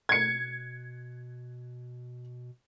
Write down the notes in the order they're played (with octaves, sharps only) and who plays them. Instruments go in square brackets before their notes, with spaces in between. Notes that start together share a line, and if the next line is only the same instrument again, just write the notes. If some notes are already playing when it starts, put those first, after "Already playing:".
[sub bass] B2 [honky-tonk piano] G#6 C#7